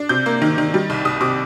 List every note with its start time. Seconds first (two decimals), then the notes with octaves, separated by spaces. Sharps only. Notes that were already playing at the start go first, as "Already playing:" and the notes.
Already playing: D4
0.09 C3 G6
0.26 A#3
0.42 D#3
0.58 D#3
0.74 G3
0.90 C2
1.05 C2 D#6
1.20 C3 D6